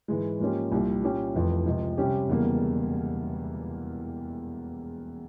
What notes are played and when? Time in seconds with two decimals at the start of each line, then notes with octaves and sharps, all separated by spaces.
0.08 G#2 E3 G#3
0.40 G#2 F3 A#3 C#4 G4
0.72 C2 A#2 G3
1.03 A#2 G3 C#4 G4
1.35 F1 F2 E3
1.66 C#2 C3 F3
1.98 C3 G3 C#4 G4
2.29 E1 E2 C#3 G3 A#3